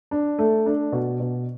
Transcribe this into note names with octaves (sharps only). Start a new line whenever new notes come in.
D4
A3
D4
B2
B2